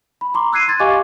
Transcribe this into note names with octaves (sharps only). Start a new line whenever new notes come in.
B5
A#5 C6 D6
E6 F#6 G#6 C7 D#7
C6 G#6 A6
G4 D#5 F5 G#5 C#6 D6